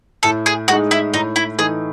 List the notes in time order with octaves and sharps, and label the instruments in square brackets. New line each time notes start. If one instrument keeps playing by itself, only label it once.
[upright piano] A2 [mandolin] A4
[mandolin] G#4
[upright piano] G#3 D#4 [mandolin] F#4
[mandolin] E4
[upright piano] A2 [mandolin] D#4
[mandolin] E4
[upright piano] E3 A3 D#4 [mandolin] G#4